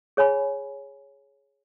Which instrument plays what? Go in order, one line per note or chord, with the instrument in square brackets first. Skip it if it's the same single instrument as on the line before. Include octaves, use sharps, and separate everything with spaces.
[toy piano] G#4 C#5 G#5 B5